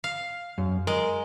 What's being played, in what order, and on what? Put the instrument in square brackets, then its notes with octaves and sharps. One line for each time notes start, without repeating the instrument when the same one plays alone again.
[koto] F5
[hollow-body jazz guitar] F#2
[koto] G#3 [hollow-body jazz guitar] A#4